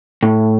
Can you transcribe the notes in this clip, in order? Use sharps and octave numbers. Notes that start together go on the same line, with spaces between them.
A2